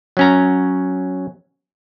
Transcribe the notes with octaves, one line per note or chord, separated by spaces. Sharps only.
F#3 C#4 A#5